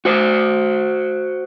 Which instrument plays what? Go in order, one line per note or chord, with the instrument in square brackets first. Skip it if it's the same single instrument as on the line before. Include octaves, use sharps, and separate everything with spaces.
[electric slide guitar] F#4 C5